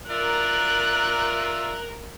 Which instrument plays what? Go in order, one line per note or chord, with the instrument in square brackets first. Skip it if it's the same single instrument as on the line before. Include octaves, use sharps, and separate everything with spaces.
[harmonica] F4 D5 E5 [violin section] A#4 [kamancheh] F#6